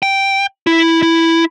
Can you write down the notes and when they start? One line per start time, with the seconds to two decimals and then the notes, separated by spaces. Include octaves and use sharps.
0.03 G5
0.67 E4
1.03 E4